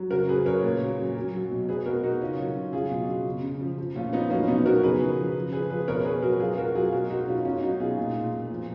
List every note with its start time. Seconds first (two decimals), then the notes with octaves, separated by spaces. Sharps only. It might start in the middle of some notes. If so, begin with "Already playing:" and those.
Already playing: F#3
0.10 C#3 F#4 A#4
0.29 F#3 G#4 B4
0.46 C#3 A#4 C#5
0.63 A#2
0.81 F#3
0.99 F#3
1.16 F#3
1.34 F#3
1.51 B2
1.68 B2 G#4 B4
1.85 B2 F#4 A#4
2.03 B2 D#4 F#4
2.21 C#3 C#4 F4
2.38 F#3
2.56 C#3
2.73 F#3 F4 G#4
2.91 B2
3.08 F#3
3.25 C#3
3.43 C#3
3.61 F3
3.78 F3
3.95 A#2 C#4 F4
4.13 F3 B3 D#4
4.30 F#3 A#3 C#4
4.48 B2 B3 D#4
4.65 F#3 F#4 A#4
4.83 C#3 G#4 B4
5.01 F3
5.18 F3
5.35 C#3
5.53 F3 G#4 B4
5.70 F3 G#4 B4
5.88 B2 A#4 C#5
6.05 B2 G#4 B4
6.22 F#3 F#4 A#4
6.40 F#3 F4 G#4
6.58 F#3 F#4 A#4
6.75 F#3 F4 G#4
6.92 B2 F#4 A#4
7.10 F#3 D#4 F#4
7.27 B2 C#4 F4
7.45 B2 C#4 F4
7.63 F#3 D#4 F#4
7.80 B2 F4 G#4
7.97 A#2
8.15 A#2
8.33 A#2
8.50 F3